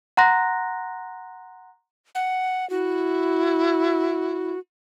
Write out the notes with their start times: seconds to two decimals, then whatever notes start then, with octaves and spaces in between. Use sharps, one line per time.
0.17 F#5 A#5 C6 F#6 A#6
2.15 F#5
2.70 E4 F#4